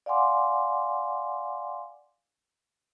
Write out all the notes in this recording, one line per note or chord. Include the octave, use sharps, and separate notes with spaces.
D5 F5 F#5 G#5 C6 D6